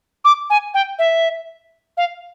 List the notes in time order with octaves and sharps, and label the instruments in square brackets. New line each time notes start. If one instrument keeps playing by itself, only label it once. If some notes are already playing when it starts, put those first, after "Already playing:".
[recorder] D6
G#5
G5
E5
F5